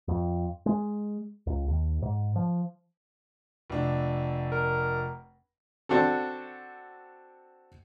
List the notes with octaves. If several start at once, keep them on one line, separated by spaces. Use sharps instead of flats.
F2
G#3
C#2
D#2
G#2
F3
F1 D4
A#4
C4 D4 F#4 A4